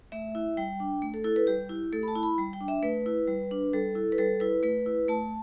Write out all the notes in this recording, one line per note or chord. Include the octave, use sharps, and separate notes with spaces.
A3 E5
E4
G3 G5
D4
A3
A4
E4 A4
B4
G3 G4
E4
A3 A4
B5
A5
E4
B5
G3
G5
D4
E5
A3 B4
E4
G3
D4
G3 A4
E4
B4
G3 A4
E4 B4
A3 B4
E4
A3 A5